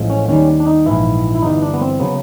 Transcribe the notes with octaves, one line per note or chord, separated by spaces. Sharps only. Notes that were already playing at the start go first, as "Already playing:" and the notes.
Already playing: A1 A2 F3 G#3
C#4
D#2 D#3 G3 C#4
D4
D#4
A#1 G#2 E3 E4
E4
G1 G2 E3 D#4
D4
B3
C4
C#3 F#3 B3